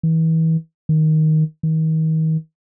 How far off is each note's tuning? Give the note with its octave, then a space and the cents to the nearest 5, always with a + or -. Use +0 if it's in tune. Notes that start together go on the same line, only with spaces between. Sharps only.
E3 -35
D#3 +5
D#3 +35